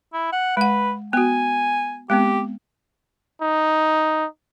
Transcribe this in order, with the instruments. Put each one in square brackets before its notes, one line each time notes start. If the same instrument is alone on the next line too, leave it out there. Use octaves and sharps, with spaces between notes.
[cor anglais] E4
F#5
[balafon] G#3 F#5 [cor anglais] B4
[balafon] B3 F#4 [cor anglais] G#5
[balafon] G#3 B3 C4 [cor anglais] G4
[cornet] D#4